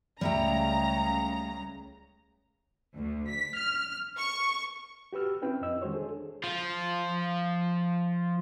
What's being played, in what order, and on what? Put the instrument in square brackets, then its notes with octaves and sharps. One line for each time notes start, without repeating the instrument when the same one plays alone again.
[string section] C#2 C#3 A#5 [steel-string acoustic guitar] G3 A3 G5
[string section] D2
B6
F6
C#6
[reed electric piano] F#4 G4 B4 E6 F6
C4 C#4 E4 B4 G5
F2 C4 E4 D#5 E6
D#3 G#3 F#4 C5 C#5
D4 G#4 A4
[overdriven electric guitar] F3 F4